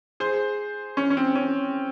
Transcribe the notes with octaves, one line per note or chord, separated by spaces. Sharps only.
G#4 C5
C#4
C#4
C4
C#4